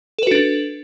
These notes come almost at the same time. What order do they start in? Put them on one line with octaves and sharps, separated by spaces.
A4 B4 F#4 D4